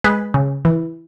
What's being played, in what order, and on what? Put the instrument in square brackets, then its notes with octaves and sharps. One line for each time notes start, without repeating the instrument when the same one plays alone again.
[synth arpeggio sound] G#3 G#4 B4
C#3
E3